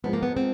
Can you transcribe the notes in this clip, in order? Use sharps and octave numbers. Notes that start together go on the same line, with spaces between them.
G#2 F3 G#3 B3
A#3
B3
C4